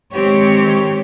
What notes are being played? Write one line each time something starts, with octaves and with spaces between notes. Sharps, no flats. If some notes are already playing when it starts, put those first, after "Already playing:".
D#3 G#3 C4 G4 C#5